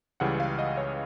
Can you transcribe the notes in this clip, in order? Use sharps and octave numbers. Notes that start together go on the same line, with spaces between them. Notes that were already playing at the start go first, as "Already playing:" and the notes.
C#2 C#3 E3 G3 F#5
F5
D#5
C#5